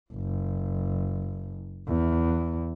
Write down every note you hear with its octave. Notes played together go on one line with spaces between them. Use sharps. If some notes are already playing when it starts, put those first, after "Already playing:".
F#1
E2